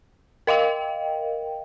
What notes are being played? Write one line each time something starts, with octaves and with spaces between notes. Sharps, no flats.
A#4 D#5 F5 G5